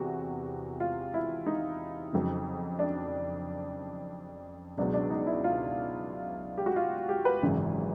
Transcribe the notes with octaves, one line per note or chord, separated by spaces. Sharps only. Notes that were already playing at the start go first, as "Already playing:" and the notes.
Already playing: E2 C3 E3 F#4
F4
E4
D#4
F2 C#3 F#3
D4
C#2 B2 F#3 D4
D4
D#4
E4
F4
G4
F#4
F4
G4
B4
G#1 F#2 C#3 E3